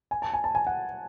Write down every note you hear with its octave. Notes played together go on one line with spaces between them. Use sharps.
G#5
A5
G#5
A5
G#5
F#5